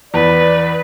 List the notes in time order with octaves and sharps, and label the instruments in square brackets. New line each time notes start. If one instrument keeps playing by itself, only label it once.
[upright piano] E2 [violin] B4 [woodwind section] D5